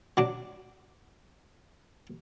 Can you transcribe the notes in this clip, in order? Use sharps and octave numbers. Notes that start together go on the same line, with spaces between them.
F#3 D4